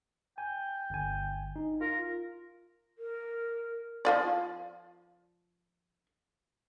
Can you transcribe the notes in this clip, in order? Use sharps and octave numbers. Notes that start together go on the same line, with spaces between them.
G5 G#5
G1 G#5
D#4
F4 A#4
A#4
F3 F4 D5